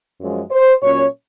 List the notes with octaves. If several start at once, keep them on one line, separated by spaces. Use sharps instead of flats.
F#2 F3 G#3
C5
A#2 F#3 C#4 C#5